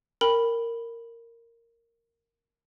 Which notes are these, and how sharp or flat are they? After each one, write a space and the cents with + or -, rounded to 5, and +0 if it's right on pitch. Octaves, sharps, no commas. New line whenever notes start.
A#4 -10 G5 +25 B5 +0